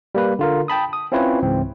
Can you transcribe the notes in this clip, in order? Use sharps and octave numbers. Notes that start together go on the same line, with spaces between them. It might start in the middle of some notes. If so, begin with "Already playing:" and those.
G3 A#3 B4
D3 F4 A#4
G5 A5 B5 D#6
D#6
C4 C#4 E4 F4 B4 C#5
C#2 G#2 E3 C4